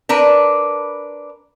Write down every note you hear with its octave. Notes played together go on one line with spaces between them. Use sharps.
D4 A#4 B4